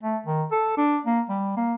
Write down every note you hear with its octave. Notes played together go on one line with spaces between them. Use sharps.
A3
D#3
A4
D4
A#3
G3
A#3